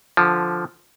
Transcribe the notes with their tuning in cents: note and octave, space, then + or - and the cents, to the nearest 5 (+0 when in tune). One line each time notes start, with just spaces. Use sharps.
D3 +0 F3 +0